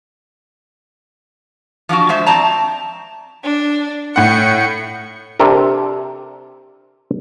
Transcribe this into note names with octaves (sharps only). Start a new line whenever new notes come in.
F3 D4 F4 F#4
G#3 C5 E5
C4 D5 A5 A#5
D4
A2 F#5 C#7
C3 D4 A4 A#4